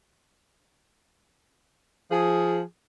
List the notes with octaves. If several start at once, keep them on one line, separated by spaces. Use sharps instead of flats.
F3 G#4